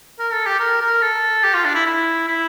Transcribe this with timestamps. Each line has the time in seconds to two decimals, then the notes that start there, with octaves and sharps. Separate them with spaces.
0.19 A#4
0.32 A4
0.46 G4
0.60 A#4
0.81 A#4
1.02 A4
1.44 G4
1.54 F4
1.65 D4
1.75 E4
1.86 E4
2.27 E4